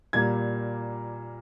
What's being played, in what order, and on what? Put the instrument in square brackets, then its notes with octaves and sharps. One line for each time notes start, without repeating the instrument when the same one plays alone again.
[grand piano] A#2 G3 A#3 G#6